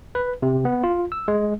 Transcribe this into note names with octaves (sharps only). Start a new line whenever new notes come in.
B4
C3
B3
F4
E6
G#3